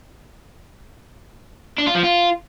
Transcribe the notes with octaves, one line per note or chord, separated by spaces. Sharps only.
D4
F4
F3
F4